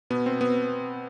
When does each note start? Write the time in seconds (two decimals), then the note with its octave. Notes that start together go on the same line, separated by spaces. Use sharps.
0.10 B2 B3
0.26 C4
0.41 B3